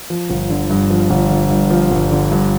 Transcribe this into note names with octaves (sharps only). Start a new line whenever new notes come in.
F3
G1
D3
G2
F3
G1
D3
G2
F3
G1
D3
G2